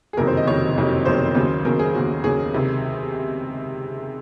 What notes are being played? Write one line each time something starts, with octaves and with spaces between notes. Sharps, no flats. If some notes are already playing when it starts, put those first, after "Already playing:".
G#4
F#1 F2 C3 D#3 F#3 A#4
C5
D#5
F#1 F2 C3 D#3 F#3 C#5
F#1 F2 C3 D#3 F#3
F#1 F2 C3 D#3 F#3 C5
D#2 C#3 F#3
D#2 C#3 F#3 A#4
G#4
D#2 C#3 F#3 F#4
D#2 C#3 F#3 G#4
C#2 C3 D#3